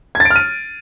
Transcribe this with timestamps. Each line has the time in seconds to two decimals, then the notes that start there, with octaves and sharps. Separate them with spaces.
0.15 G#6
0.20 A6
0.25 D7
0.30 F6
0.36 D#7